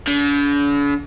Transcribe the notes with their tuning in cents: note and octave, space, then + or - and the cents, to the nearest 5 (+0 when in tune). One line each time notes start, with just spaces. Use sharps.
D3 -45